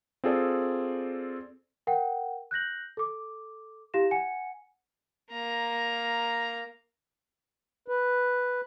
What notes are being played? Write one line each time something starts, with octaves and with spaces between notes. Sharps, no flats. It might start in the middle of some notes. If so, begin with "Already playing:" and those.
C4 F4 G#4 A4 D5
A#4 F#5 G5
F#6 G6 A#6 F#7
A4 D6
E4 G4 F5 A#6 E7
F#5 G#5 C#7
A#3 A#5
B4